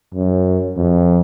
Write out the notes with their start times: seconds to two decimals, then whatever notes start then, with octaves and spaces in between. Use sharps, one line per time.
0.14 F#2
0.77 F2